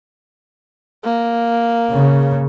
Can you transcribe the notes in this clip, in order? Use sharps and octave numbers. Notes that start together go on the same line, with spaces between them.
A#3
C#3